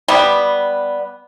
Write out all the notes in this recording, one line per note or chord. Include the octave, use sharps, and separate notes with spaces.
G3 B3